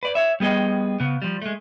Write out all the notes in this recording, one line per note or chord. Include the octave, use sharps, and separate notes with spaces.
B4 D5
C#5 E5
G3 B3 G#4 D#5 G5
C#3 B3
F3 G3
G#3 A3